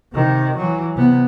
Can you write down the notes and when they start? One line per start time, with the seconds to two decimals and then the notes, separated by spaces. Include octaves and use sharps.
0.13 C3 D#3
0.56 E3 F#3
0.96 C3 B3